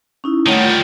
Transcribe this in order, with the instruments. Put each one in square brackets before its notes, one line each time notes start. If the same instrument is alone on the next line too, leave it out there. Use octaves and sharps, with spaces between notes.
[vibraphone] C#4 D#4 E4
[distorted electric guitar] D#3 G3 [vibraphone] A3 C#5 F#5
[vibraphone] F4